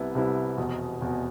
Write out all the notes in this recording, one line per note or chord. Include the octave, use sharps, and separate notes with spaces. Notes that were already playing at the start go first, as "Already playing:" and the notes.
Already playing: C2 C3 G3 B3 E4
C2 C3 G3 B3 E4
F1 E2 B2
F1 E2 B2